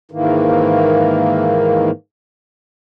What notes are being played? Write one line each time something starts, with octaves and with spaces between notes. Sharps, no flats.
G#2 D#3 E3 A#3